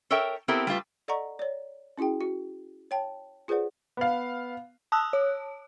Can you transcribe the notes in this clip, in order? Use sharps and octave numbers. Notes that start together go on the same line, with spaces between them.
A4 A#4 C#5 E5 G5
B3 C4 E4 G4 A4 A#4
G3 A3 F4 B4
A4 D5 D#5 F#5 A#5 C#6
C#5 D5
C#4 E4 F#4 G#4 G5
F#4
C#5 G5 A5
F4 G#4 B4 C5 D5 F#5
B3 F5
A5 D#6 E6 F#6
C#5